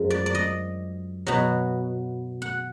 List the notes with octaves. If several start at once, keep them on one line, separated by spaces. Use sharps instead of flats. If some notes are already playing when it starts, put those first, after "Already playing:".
Already playing: F#2 F3 G#3
D5
D5
D#5
B2 F#3
F#5